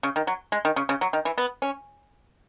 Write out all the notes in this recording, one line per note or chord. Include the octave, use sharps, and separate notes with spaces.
C#3
D#3
F#3
G#3
D#3
C#3
C#3
F#3
D#3
E3
B3
C#4